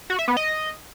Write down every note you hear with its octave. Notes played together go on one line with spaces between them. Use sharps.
F#4
E5
B3
D#5